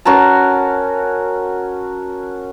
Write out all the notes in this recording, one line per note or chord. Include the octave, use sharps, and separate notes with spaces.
C#4 F#4 A#4 A5